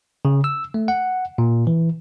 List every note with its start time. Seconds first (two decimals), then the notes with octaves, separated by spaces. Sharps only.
0.25 C#3
0.44 E6
0.74 A3
0.88 F#5
1.38 A#2
1.67 E3